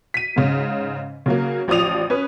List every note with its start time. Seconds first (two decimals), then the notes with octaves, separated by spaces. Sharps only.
0.14 B6 D#7
0.36 G#2 C#3
1.26 C#3 F#3 A#3
1.68 A1 F3 D5 D#6 F7
2.10 C#4 B4